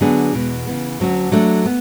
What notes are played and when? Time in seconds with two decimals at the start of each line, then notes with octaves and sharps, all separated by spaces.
0.01 D3 F#3 B3 D4 G#4
0.33 E2 B2 G#3
0.67 C#3 E3 B3
1.00 D2 D3 F#3 C#4 F#4
1.32 F#3 A3 D4
1.66 B3